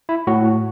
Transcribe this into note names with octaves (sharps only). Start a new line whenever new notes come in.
E4
A2 F#4